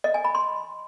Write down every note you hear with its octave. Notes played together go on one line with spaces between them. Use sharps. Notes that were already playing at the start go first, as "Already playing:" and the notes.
D#5
G#5
B5
C6